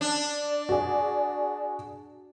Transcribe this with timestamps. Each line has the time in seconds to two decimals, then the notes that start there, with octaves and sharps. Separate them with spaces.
0.01 D4 D5
0.69 F#4 G#4